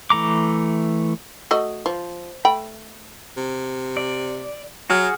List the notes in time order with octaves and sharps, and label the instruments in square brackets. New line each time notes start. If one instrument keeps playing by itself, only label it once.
[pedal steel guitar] E3 A3 A#5 D6
[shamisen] A3 F#4 D#5
F3
A3 G5 B5
[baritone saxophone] C3
[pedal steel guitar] D5
[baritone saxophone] F#3 [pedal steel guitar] F#4 G#4 F6